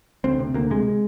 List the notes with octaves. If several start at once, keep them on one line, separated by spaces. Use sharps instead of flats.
D2 C4
C3
D2 A#3
C3 G#3